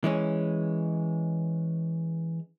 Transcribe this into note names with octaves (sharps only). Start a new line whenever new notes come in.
E3 G#3 C#4